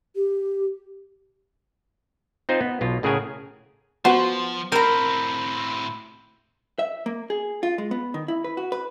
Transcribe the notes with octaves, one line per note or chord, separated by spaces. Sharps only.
G4
C4 D#4 F4 C5
B3
B1 B2 F4
A2 C#3 G#4 A#4 F#5 G#5
F3 B3 F#4 C5
A2 C4 A#4 A#5 B5 G6
E5
A#3
G#4
F4
G#3
B3
D#3
E4
B4
F#4
B4